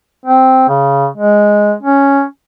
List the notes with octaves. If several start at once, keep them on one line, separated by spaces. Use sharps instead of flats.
C4
C#3
G#3
C#4